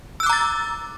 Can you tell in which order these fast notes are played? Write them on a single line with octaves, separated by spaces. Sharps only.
E6 F#6 D6 A#5 A6